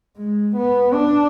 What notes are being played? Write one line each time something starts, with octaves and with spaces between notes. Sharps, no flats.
G#3
B3
D4